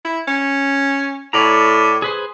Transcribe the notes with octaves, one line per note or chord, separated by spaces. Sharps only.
E4
C#4
A2 C#5 D5 A#5
G#4 B4 C5